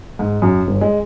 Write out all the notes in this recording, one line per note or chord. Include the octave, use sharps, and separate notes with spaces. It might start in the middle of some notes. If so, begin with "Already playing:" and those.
G#2
F#2
G1
G#3